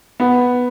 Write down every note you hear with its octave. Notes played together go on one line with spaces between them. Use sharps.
B3